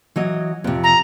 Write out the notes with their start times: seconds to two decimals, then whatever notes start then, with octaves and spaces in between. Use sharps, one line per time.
0.16 E3 F#3 D#5
0.64 F2 C3
0.84 A#5